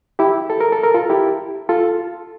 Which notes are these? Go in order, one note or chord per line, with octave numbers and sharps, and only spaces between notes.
E4 G4
A4
A#4
A4
A#4
F4 A4
E4 G4
F4 A4